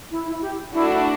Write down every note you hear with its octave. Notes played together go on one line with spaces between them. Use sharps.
E4
E4
G4
A3 D4 E4 F#4